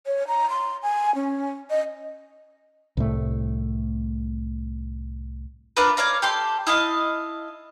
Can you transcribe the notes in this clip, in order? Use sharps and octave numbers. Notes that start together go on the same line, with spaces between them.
C#5
A#5
C6
G#5
C#4
D#5
C2 A2 A3
D4 F4 A#4 B4
C#5 D5 F5 A#5
G4 A4 C6 D6
E4 D#5 F5 A5